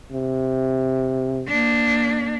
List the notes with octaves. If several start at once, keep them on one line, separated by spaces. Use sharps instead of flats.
C3
A#3 D4